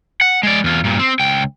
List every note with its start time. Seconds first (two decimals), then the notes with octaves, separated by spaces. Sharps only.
0.21 F#5
0.43 G#3 D5
0.64 E2 F4
0.84 G2 A#2
0.99 C4
1.20 C#2 G5